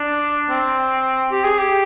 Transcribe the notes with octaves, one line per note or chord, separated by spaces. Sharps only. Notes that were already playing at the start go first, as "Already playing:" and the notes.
Already playing: D4
C4
G4
G#4
G4